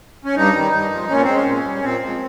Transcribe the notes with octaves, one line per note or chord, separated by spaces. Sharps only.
C#4
G2 D#4
D#3 G3
G2
F3 G#3
A#2 C#4
C4
G#3
C#4
A#2
G3
A#2 C4
F3 G#3